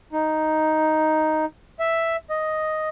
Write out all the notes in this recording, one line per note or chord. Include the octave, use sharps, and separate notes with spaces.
D#4
E5
D#5